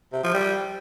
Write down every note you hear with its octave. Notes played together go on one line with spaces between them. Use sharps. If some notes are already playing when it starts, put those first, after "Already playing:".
C3
F3
G3